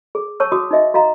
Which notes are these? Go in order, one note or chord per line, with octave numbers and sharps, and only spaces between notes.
G#4
C#5 A5 C#6 E6
F#4 D6 D#6
D#4 F#4 D#5 E5
F#4 D#5 F5 A#5